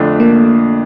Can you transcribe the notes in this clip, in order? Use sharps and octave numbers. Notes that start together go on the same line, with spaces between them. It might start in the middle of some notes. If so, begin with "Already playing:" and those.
Already playing: F2 D3 A3 D4
A#3